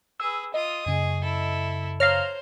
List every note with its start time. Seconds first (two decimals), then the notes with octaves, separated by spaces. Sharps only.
0.20 G#4 B4 E6
0.54 F4 D#5 D#6
0.86 F#2 C#3 G#4
1.22 E4 A4
2.00 C5 C#5 F5 A#5 F6